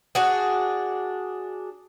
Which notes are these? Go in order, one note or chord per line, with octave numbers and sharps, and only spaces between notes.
D4 F#4 G#4